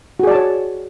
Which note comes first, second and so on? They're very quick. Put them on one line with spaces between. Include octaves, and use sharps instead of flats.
F#4 G#4 D5 A5 C#5